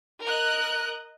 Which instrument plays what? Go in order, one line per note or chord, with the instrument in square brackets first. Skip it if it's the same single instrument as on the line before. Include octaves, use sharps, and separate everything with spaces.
[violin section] A#4 D#5 F#6